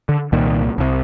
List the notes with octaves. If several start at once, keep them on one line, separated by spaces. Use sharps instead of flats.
D3
C2 A#2 D#3
C2 C3